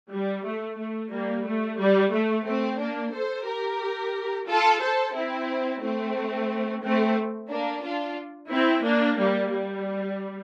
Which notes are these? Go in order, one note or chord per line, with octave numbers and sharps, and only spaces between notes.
G3
A3
A3
G3 A#3
A3
G3
A3
A3 C4
A#3 D4
A4 C5
G4 A#4
F4 A4
A4 C5
C4 E4
A3 C4
A3 C4
A#3 D4
D4 F4
C4 E4
A#3 D4
G3 A#3
G3